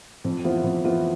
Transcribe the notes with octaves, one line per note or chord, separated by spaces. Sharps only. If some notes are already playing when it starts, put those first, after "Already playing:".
F2
E3 B3 F4 C5
F2
E3 B3 F4 C5